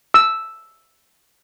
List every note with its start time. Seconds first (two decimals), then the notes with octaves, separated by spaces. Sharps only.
0.14 E6